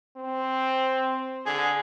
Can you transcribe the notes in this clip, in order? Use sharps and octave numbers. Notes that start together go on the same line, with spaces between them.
C4
D3 G#4